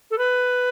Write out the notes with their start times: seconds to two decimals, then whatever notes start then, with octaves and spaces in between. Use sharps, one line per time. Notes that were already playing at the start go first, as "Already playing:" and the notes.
0.11 A4
0.18 B4